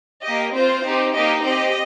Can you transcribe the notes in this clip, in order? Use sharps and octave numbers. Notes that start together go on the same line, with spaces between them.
A#3 G4 D#5
C4 F4 C5
C4 D#4 G4
A#3 D#4 G4 D#5
C4 G4 D#5